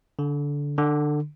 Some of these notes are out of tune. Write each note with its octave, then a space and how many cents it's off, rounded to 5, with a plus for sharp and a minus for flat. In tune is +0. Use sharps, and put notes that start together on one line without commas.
D3 -20
D3 +20